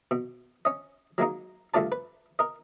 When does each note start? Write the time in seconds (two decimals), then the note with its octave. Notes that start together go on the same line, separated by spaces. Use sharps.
0.11 B2
0.65 C#4 D#5
1.18 F#3 G#3 A#3 D#4
1.74 C#2 G2 A3 F4 D5 A5
1.92 B4
2.39 A#4 D#5